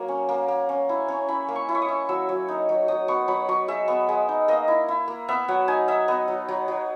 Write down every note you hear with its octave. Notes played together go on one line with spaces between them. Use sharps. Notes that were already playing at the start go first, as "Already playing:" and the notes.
Already playing: F#3 A#3
C#4
A#3
A#3
C#4
E4
C#4
E4 B5
A#3
C#6
E4
C#6
D#6
E4
F#3 E6
F#3
D#4
F#3
F#3 D#6
B3 C#6
F#3 B5
F#3 C#6
G#3 E5
B3
G#3
D#4
A#3 D#5
E4
E4
A#3
B3 E5
F#3 F#5
D#4 G#5
D#4 E5
B3 D#5
F#3
F#3
F#3